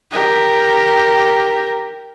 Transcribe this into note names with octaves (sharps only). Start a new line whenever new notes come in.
G4 A#4